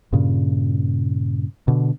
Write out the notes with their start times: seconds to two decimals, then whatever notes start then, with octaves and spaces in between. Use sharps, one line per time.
0.13 G2 A#2 C#3
1.68 B2 D3